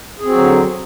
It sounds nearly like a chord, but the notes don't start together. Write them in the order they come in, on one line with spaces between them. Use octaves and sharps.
G#4 C4 F#4 F#3 D3